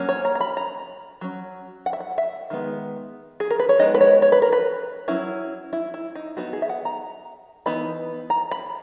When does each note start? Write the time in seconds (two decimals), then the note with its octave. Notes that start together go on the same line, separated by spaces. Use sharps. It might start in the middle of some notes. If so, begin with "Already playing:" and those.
Already playing: F#3 A#3 C#4
0.09 C#5
0.25 A#5
0.35 A#5
0.41 B5
0.57 A#5
1.21 F#3 C#4
1.86 F#5
1.93 E5
2.00 F#5
2.18 E5
2.50 D#3 G#3 B3
3.40 G#4
3.50 A#4
3.59 B4
3.69 C#5
3.79 G#3 B3 D#4 D#5
3.94 B4
4.01 C#5
4.22 C#5
4.32 B4
4.42 A#4
4.53 B4
5.08 F#3 C#4 E4
5.73 E4
5.94 E4
6.15 D#4
6.37 F#3 B3 D#4 F#4
6.53 G#4
6.62 E5
6.69 F#5
6.85 A#5
7.66 E3 B3 D#4 B5
8.30 A#5
8.51 B5